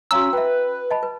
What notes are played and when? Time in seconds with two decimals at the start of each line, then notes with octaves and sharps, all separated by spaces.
0.11 C#4 F#4 F5 A#5 E6
0.33 B4 E5 G5
0.91 D#5 A5 B5
1.03 B4